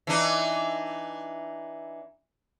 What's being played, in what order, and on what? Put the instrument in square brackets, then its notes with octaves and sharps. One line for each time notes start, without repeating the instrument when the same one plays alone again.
[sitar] E3 D4 D#4